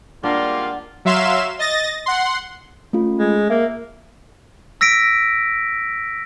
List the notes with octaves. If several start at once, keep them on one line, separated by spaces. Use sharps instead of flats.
G3 G#3 A#3 D4 F4 F#5
F#3 E5 F5 C6 E7
D#5 A6 A#6
F#5 C6
A3 C#4 F4
G#3
A#3 E5
E6 A#6 B6 D7